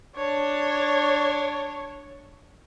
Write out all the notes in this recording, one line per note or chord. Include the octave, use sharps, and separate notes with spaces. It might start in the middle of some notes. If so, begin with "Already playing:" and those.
D4 C#5